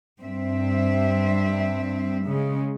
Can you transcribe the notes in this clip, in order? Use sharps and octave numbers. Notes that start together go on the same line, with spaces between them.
G2 C4 E5
C#3 G#3